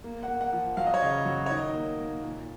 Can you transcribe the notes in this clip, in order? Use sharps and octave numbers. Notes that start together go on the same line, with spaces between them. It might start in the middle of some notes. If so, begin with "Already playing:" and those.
A#3
F#5
A#3
F#5
F3
F#3 F5
D#5
C#5
C#3 D#5
F#3
C#5
D#3 D#5
A#3
A#3
A#2